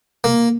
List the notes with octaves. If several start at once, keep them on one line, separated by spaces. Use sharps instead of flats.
A#3